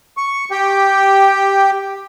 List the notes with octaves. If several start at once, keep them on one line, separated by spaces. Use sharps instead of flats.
C#6
G4 G5